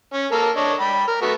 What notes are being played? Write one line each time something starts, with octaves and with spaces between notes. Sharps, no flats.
C#4
A#3 A4 A#4
D4 C#5 D#5
G5 B5
A#4
A3 B3 F#4